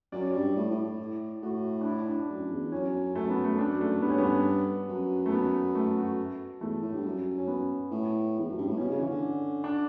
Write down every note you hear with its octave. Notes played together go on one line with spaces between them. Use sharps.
F#2 D5
C#5
G2 D5
A2
A2
A2
A2 F#4
D4
E4
D4
F#2
E2
F#2 C#4
F#2 A3
B3
A3
F#2 D4
A3
G2 B3
C#4
B3
F#2
A3
B3
A3
F#4
E2 A3
A2
G2
F#2
C#4
B3
A2
E2
F#2
G2
A2
B2 C#4
C#3
E3 C#4
D3
D4